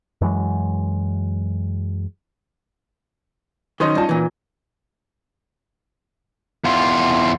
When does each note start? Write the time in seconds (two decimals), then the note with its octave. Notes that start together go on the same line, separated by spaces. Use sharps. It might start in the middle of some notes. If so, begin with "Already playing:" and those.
0.21 F#2 E3 F#3 G#3
3.80 D#3 F#3 C#4 D#4 C5 D#5
3.95 G2 F4 A5
4.09 A#2 E3
6.65 E2 F4